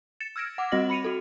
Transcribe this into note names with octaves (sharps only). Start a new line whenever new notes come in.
A6 C#7 E7
E6 F6 G#6 A#6 D7 E7
F#5 D6
G3 C4 F#4 D#5 A#6 F#7
B5 C#7 D#7 F7
F#4 A4